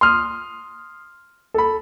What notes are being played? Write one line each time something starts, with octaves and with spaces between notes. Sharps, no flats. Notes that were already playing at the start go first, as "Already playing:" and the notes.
C6 D#6 F6
A4 B5